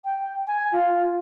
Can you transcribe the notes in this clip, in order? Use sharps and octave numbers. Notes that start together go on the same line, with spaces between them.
G5
G#5
F4